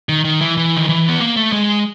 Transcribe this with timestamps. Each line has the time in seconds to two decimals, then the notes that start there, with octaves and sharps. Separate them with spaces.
0.09 D#3
0.25 D#3
0.41 E3
0.57 E3
0.77 D#3
0.89 E3
1.09 B3
1.20 A#3
1.36 A3
1.52 G#3